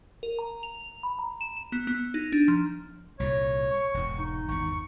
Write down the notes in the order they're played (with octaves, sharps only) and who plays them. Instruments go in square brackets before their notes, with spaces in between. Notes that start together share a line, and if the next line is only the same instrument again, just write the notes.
[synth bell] A#4
A#5
F7
B5
A#5
E7
E7
B3
B3
D#4
D4
F3
[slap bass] C2 A#2 [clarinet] C#5
[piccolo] C#6
[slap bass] E1 G#2
[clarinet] D#4
[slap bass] G#1 E2 [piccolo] C#6